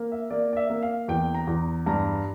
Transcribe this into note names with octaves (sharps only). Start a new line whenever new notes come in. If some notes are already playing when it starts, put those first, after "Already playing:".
Already playing: A#3
E5
A#3 D5
D5
E5
A#3
F5
E2 G5
A#5
E2
G2 A#5